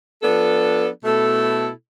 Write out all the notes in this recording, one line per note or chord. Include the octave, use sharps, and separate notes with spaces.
F3 B3 D4 A4
B2 A3 E4 A4